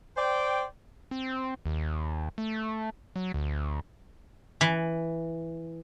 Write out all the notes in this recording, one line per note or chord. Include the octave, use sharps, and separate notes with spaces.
C5 D5 G5
C4
D#2
A3
F#3
D2
E3